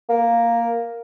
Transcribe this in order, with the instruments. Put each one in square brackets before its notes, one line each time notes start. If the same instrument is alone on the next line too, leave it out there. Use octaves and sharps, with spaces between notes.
[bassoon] A#3